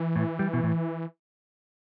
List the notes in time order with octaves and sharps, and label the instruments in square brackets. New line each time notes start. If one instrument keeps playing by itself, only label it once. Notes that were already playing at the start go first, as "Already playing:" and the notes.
Already playing: [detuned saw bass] E3
[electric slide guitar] A2
G3
B2
A2